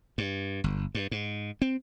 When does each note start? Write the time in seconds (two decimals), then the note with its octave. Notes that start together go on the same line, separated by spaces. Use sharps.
0.18 G2
0.64 G1
0.95 G2
1.11 G#2
1.62 C4